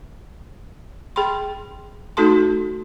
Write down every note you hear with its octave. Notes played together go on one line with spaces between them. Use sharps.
G#4 G5 B5 C6
A3 D#4 F#4 A4 A5 C6